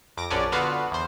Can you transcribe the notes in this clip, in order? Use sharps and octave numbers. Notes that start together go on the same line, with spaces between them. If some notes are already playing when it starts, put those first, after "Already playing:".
F2 D6 A#6
A#1 F#2 C#4 D4 D5
D3 B3 F4 F#4 B4 F5
E2 C5